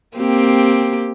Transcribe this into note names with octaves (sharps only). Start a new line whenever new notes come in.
A#3 C4 G4